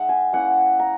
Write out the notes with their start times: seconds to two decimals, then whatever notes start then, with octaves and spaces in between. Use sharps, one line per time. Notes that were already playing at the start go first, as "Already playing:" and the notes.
Already playing: G#3 D#4 E5 F#5
0.09 G#5
0.33 A#3 C#4 E4 F#5
0.79 A#5